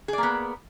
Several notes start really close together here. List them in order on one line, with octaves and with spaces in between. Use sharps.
G#4 D5 A#3 B3